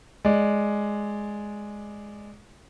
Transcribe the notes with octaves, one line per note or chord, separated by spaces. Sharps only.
G#3 D5